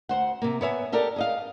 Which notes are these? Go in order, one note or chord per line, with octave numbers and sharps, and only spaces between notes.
D2 C5 F#5
C3 A#3
B3 C#5 E5 G#5
G4 A4 A#4 D5
G#4 D#5 F5